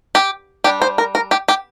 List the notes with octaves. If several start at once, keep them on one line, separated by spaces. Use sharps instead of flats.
G4
G3 D4 G4
C5
A#4
A#4
G4
G4